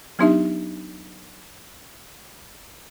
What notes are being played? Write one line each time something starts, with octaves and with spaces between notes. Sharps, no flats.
F#3 B3 D4 D#4 G4 E5